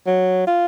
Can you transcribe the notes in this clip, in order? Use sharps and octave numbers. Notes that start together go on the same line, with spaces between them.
F#3
F4